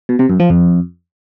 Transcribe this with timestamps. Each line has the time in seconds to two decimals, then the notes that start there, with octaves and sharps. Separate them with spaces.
0.09 B2
0.19 C3
0.30 F#2
0.40 F3
0.50 F2